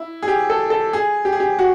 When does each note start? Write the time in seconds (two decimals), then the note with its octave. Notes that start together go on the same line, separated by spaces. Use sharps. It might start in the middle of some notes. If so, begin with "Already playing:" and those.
Already playing: E4
0.22 G#4
0.28 G4
0.50 A4
0.70 A4
0.93 G#4
1.25 G4
1.32 G#4
1.40 G4
1.59 F#4